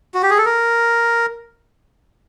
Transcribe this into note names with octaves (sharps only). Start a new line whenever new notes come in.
F#4
G4
G#4
A4
A#4